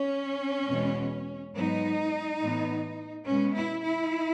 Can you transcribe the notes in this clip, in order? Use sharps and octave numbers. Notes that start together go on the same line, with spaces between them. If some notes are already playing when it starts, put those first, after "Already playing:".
Already playing: C#4
E2 B2 G#3 B3
G#2 F#3 B3 D#4
A2 E3 B3
B2 G#3 B3 C#4
E4
E4